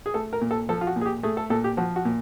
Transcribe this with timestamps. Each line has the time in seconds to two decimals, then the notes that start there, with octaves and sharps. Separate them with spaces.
0.06 G#4
0.14 A3 A4
0.33 A#4
0.41 A#2
0.51 A4
0.69 F3 A4
0.81 F4
0.87 F#4
0.96 A#2
1.01 G#4
1.06 G4
1.23 A3 G#4
1.37 A4
1.50 A#2 A4
1.64 G4
1.77 F3 F#4
1.96 F#4
2.05 A#2